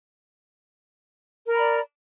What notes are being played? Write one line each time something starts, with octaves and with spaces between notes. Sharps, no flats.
A#4 D5 A#5 B5